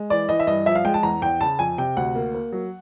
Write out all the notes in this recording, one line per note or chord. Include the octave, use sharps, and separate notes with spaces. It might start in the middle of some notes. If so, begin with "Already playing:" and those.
Already playing: G#3
E3 D5
E3 D#5
E5
G2 D#5
F3 E5
F5
G#3 G5
A5
E2 A#5
E2 G5
C#3 A5
F2 G#5
C3 G5
D2 F#5
A#3
A#3
F#3